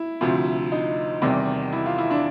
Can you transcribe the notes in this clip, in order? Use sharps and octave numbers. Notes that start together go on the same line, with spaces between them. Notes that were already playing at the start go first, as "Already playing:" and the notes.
Already playing: E4
D2 C3 F3
D#4
E2 C3 D#3 G3
E4
F4
E4
D4